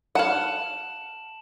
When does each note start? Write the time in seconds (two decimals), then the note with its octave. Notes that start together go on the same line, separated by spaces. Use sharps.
0.15 F5 F#5 A5 E7 F#7